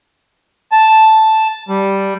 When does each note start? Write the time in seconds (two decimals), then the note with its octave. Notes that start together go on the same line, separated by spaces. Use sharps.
0.72 A5
1.69 G3